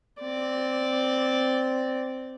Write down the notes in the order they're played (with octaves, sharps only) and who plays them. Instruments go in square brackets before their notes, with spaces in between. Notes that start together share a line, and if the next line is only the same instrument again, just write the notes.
[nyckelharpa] C4 D5